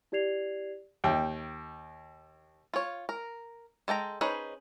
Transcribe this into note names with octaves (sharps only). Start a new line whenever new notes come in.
E4 G4 D5 G#6 C7 F7
D#2 G5
F4 C#5
A#4
G#3 A4 G5 A#5
C#4 D#4 G#4 B4 C5